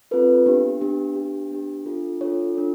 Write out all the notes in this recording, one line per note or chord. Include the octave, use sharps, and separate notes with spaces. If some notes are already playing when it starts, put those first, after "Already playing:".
C4 F4 A4 B4
B3 D4 G4
B3 D4 G4
B3 D4 G4
B3 D4 G4
D4 F4 A4
D4 F4 A4 C#5
D4 F4 A4